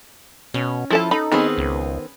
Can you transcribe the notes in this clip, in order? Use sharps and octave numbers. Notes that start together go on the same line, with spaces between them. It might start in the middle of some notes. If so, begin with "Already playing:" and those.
B2 C#4
F3 E4 A4 A5
D#4 A4 B5
D#3 B3 C4 G#4 B4 B5
C#2